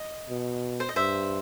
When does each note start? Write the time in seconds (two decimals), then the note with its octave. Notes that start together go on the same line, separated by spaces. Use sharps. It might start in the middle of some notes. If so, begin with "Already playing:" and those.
Already playing: D#5
0.30 B2
0.80 C5
0.89 D#5
0.96 G2 C5 E5